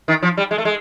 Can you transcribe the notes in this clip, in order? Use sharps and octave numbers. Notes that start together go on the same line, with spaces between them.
D#3
F3
G3
G#3
A3
G#3